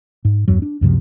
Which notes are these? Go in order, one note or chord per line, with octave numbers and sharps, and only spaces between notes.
G#2
E2 G2 F#3
D4
C#2 F#2 C3 F3